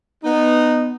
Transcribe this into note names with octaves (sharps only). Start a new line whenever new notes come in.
B3 D#4